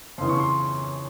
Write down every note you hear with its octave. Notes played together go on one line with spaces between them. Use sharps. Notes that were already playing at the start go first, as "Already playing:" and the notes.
F2 C#3 E3 C6
C#6
C6